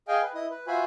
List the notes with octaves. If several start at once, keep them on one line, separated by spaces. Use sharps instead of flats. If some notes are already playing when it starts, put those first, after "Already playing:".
G#4 D#5 F5 G5 G#5
B4
E4 D#5 D#6
B4
F4 F#4 C5 E5 G#5 B5